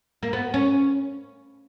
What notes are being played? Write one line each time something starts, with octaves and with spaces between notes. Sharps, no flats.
A#3
B3
C#4